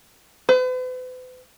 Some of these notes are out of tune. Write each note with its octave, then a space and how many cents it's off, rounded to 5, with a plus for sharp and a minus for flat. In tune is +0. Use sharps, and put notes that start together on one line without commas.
B4 +45